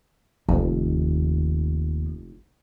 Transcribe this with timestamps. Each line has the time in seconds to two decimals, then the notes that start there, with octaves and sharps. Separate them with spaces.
0.49 F1 D#2